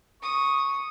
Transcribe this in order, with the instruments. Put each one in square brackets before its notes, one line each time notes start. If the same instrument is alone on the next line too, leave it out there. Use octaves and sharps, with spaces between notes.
[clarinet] C#6 [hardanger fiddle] D#6